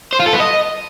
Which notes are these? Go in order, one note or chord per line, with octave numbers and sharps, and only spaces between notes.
C5
F4
A4
B3
D#5